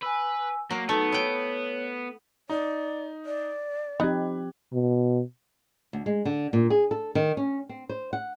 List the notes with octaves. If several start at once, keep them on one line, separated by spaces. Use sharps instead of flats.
B4 G#5 E6
F#3 A#3
A3 B3 D#4
E4 C#5 G5
D#4 D5
D5
F3 C4 D#4 G4 D#5 B5 F#6 G#6
B2
D2
G#3
D3
A#2
G#4
A4
D#3
C#4
C4
C5
F#5